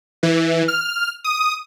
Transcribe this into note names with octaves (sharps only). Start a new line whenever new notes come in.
E3
F6
D#6